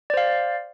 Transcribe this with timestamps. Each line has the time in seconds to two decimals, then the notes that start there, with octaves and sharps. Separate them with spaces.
0.10 D5
0.14 C5
0.17 F5